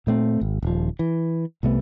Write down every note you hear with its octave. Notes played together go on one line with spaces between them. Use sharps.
A#2 A3 C4
G#1
D#1 F3
E3
C2 C3 A3 B3